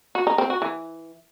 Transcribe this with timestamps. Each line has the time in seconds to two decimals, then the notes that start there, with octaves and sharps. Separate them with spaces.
0.15 F#4
0.27 D#4
0.38 C4
0.50 F#4
0.62 E3